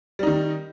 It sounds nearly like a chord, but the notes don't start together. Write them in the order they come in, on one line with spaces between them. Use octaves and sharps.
G3 D#4 D#3